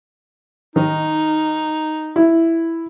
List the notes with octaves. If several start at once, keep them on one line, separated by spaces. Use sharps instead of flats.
D#3 D#4
E4